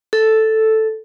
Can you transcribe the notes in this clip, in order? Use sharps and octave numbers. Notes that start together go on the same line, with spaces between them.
A4